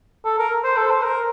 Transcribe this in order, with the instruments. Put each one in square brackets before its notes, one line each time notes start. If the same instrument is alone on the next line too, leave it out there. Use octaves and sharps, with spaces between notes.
[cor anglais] A4
A#4
C5
A4
C5
A#4